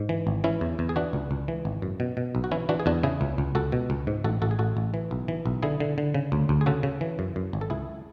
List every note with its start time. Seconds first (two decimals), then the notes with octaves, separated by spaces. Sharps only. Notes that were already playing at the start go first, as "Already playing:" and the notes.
Already playing: G#2
0.09 E3
0.27 G#1
0.44 E3 C#4 E4
0.61 E2
0.79 E2
0.89 G#4
0.96 E3 D4 F#4
1.13 C#2
1.31 C#2
1.48 E3
1.65 G#1
1.82 F#2
2.00 B2
2.17 B2
2.35 B1
2.44 F#4
2.51 E3 C#4 E4
2.69 E3 D4 F#4
2.80 G#4
2.86 E2 D4 F#4
3.03 C#3 E4 G#4
3.21 C#2
3.38 C#2
3.55 C#2 F#4 A4
3.72 B2
3.90 C#2
4.07 G#2
4.24 A1 F#4 A4
4.42 A1 F#4 A4
4.51 G#4
4.59 A1 F#4 A4
4.77 A1
4.94 E3
5.11 B1
5.28 E3
5.46 B1
5.63 D3 E4 G#4
5.80 D3
5.98 D3
6.14 C#3
6.32 D2
6.49 D2
6.61 G#4
6.66 C#3 F#4 A4
6.83 C#3
7.01 E3
7.19 F#2
7.36 F#2
7.53 G#1
7.61 A4
7.70 C#2 E4 G#4